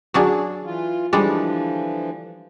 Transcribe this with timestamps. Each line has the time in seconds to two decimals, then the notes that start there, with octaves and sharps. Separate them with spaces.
0.14 F#3 D4 G#4
0.65 E3 F4
1.13 D3 E3 F3 G3 G#3 D4